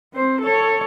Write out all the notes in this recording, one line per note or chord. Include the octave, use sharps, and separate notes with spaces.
C4 C5
A4 C#5